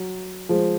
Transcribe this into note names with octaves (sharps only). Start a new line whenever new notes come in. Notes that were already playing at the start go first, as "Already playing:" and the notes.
Already playing: F#3
F3 G#3